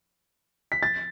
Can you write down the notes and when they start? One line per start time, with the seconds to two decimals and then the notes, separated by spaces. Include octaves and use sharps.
0.72 B6
0.83 A6